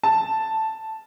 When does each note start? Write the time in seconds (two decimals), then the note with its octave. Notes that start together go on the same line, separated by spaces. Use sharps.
0.03 A5